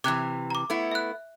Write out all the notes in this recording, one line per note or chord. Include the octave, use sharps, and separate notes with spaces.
C3 E3 D6 F#6 G#6
A#5 D6
A3 B3 E4
E5 F#6